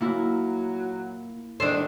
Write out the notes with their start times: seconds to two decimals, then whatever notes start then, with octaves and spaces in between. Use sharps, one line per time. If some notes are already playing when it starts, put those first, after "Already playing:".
0.01 A#2 F#3 A#3 E4
1.60 F#2 D#3 G#3 D4 A4 C5